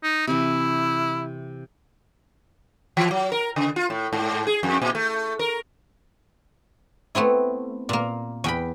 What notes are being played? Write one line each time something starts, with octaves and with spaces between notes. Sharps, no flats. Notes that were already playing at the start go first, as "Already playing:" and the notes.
D#4
C3 E3 E4
E3
F#3
A#4
C#3
F4
A2
G#2
G#4
F2
A#2
A3
A#4
A3 B3 C4 E4
A#2 A#3
E2 G5 B5